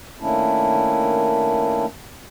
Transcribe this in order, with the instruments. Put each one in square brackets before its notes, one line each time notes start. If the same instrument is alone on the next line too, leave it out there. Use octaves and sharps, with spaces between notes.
[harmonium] D#3 A3 A#3 C#4 D4 E4